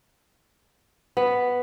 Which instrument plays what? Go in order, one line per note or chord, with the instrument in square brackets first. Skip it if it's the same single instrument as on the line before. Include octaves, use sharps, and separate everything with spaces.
[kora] B3